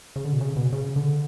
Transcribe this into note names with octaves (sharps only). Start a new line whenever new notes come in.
C#3
D3
B2
C#3
B2
C#3
D3